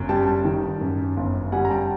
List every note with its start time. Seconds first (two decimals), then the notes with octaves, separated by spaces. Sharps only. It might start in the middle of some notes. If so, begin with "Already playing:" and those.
Already playing: G1 F#2
0.09 G3 G5 A5
0.45 D#3
0.81 F#2
1.17 G1
1.52 G3 F#5 G#5
1.65 A#5
1.70 G5 A5